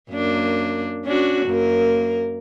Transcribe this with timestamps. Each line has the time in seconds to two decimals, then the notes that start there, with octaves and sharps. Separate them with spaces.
0.11 F#2 A#3 D4
1.05 C#4 D4 F#4
1.46 F#2 A#3 A#4